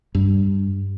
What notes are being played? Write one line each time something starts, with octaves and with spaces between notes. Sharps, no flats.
G2